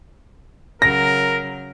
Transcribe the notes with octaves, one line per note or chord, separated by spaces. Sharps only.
C#3 F#3 A#4 A#6